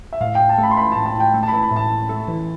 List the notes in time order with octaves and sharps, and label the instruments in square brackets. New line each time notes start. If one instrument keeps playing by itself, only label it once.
[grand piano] E5
[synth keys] A2 [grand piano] F5
[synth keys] A2 [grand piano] G5
[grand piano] A5
[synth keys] A3
[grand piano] B5
C6
[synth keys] E3 [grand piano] B5
[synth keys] A2 [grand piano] A5
[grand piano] A5
[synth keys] A2
[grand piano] G5
[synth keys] A3
[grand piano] A5
[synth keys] E3 [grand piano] B5
[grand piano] B5
[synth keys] A2 [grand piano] A5
[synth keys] A2
A3
E3